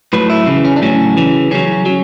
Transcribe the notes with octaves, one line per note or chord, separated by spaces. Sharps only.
A2 F#3 B4
E4
C#3 E3
C#4
D4
A2 F#3 C#4
C#3 E3
C#3 F#3 C#4
F#3